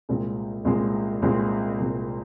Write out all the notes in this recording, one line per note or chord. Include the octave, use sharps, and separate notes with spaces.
C2 A#2 G#3 C4
C2 A#2 G#3 C4
C2 A#2 G#3 C4
C2 A#2 G#3 C4